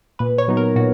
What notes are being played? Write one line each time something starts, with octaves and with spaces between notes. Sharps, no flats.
A#2 B4
C#5
F#3 B3 D#4
A#4
A#2 F#4